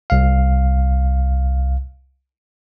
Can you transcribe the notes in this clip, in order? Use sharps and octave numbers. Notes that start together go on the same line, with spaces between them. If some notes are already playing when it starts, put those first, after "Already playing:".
C2 F5